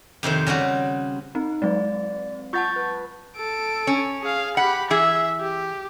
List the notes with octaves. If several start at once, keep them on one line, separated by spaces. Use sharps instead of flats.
F2 C3 D#3 C5
C#3 G3 C4 F#4
C4 D#4
F#3 G#3 C4 D5
F4 F#5 A5 C#6 G6 A6
B4
A4 D7
C#4
G#4 F5
G4 F#5 B5
E3 G#4 E5
G4